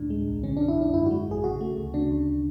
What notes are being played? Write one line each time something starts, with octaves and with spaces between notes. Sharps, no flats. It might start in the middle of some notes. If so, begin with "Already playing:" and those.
Already playing: D2 A2 D4
G#3
B1
D3 C#4
D4
F#2
E4
F#2 D4
G#2 E4
F#4
G#3
A1 G#4
C#3 F#4
A3
D2
C#3 D4
D2